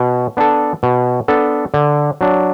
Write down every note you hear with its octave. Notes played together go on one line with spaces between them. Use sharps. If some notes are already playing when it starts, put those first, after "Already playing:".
Already playing: B2
B3 D4 A4
B2
B3 D4 A4
D3
F#3 D4